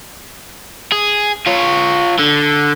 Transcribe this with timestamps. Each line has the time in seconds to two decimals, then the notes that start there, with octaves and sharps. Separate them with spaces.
0.92 G#4
1.47 F4 C#5
2.19 D3